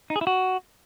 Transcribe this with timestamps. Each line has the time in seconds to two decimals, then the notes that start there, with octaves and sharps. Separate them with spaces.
0.10 D#4
0.16 G#4
0.21 E4
0.27 F#4